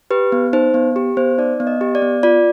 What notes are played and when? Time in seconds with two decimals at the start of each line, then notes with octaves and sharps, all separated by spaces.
0.11 G4 B4
0.32 B3
0.53 D#4 C5
0.74 B3
0.96 G4
1.17 B3 C5
1.38 D#4 D5
1.60 B3
1.67 D#5
1.81 G4
1.95 D5
2.02 B3
2.23 F4 D5